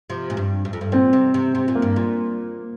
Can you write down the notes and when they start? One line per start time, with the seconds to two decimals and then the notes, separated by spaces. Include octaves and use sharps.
0.09 C3 F3
0.30 A#2
0.37 G2
0.65 G2
0.73 F2
0.81 G2
0.92 A#2 C4
1.13 C3
1.34 C3
1.55 C3
1.68 A#2
1.75 A#3
1.82 G2
1.96 A#2